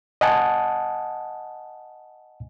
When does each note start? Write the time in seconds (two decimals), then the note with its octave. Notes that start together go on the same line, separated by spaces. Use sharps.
0.21 D#5 F#5 G#5 A5